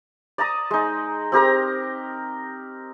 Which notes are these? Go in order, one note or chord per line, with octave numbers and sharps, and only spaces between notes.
D5 A5 A#5 D#6
G#3 D#4
C4 G4 A#4 A#5